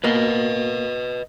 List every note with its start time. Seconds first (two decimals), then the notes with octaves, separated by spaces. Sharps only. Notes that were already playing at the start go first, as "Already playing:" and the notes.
0.04 B2 A#3 B4 D#5